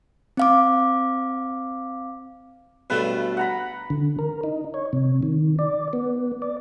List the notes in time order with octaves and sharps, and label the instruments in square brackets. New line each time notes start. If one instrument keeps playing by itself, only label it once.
[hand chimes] C4 F5 D6
[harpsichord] B1 G2 A3 [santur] B4
[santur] F#5 A#5 B5
[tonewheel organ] D3
A#4
D#4
C#5
C3
D#3
D5
B3
D5